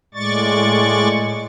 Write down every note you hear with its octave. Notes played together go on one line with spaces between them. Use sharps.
A2 G#3 D5 C#6 A6